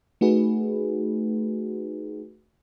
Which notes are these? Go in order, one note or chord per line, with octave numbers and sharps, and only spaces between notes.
A3 D#4 F#4 G#4 B4